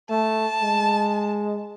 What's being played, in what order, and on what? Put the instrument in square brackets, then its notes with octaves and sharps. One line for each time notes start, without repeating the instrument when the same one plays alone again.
[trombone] A3 [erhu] A5
[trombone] G#3